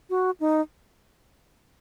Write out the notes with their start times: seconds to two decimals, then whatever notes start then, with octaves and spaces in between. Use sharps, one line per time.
0.10 F#4
0.40 D#4